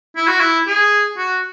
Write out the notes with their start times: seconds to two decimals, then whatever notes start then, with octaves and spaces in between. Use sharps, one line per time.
0.16 E4
0.27 F#4
0.39 E4
0.67 G#4
1.18 F#4